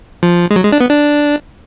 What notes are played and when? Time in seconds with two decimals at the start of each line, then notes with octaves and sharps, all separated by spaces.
0.23 F3
0.51 G#3
0.56 F#3
0.64 G#3
0.72 D4
0.81 B3
0.89 D4